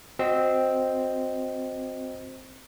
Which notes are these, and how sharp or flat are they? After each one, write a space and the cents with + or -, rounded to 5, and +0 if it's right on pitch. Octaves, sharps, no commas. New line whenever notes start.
C4 +0 F#4 -15 D#5 +0